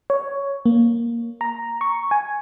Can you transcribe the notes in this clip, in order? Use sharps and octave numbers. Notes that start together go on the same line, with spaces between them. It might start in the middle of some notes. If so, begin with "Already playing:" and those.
C#5
A#3
A#5
C#6
G#5